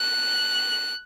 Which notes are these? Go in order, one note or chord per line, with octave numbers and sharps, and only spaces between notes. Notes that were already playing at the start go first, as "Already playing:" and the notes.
Already playing: F#6